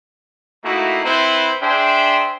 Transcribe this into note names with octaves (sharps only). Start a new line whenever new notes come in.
A3 A#3 D#4 E4 F#4
C4 E4 B4 C5
D4 G#4 C5 E5 G5